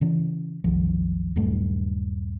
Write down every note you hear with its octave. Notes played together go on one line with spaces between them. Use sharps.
C#3 E3 C#4
F#1 C2 D#3 F3
D#1 G2 F#3 A3